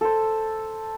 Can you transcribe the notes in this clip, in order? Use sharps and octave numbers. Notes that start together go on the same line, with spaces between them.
A4 C5